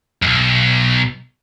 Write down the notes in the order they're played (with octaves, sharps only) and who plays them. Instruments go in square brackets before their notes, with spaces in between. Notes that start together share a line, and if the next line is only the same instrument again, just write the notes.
[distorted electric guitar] B1 F#2